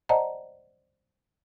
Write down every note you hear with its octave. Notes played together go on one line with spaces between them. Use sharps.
C5 D5 D#5 F#5 A5 A#5